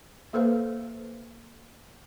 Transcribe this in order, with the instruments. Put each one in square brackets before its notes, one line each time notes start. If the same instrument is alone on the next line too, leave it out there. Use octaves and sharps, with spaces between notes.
[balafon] A#3 A4 B4 C5 F5